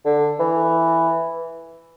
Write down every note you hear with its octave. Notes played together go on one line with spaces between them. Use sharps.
D3
E3